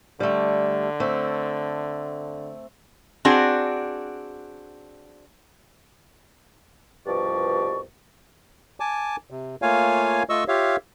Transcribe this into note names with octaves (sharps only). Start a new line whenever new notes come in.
D3 G3 A3
A3 C4
C4 D4 F#4 G#4
C2 G2 B2 F3 D5 C#6
G#5 A5 D6
C3
A3 A#3 F4 C#5 F5 G#5
A3 F4 D#5 C#6 E6
F4 G4 C#5 E5 F5